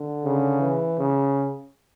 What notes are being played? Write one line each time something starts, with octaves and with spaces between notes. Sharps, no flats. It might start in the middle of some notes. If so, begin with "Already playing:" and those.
Already playing: D3
C#3
E3
C#3